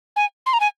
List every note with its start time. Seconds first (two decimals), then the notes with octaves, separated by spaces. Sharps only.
0.16 G#5
0.46 C6
0.53 A#5
0.60 G#5